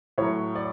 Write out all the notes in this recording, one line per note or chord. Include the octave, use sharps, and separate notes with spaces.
A2 F#3 C#5
D5